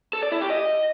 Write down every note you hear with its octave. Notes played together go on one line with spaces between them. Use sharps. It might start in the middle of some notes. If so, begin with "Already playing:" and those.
A4
D5
E4
G4
D#5